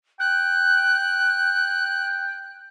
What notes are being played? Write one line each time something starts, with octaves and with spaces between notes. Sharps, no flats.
G5 F#6